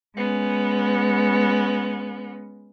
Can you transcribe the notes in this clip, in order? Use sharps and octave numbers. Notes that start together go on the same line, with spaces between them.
G#3 B3 C#4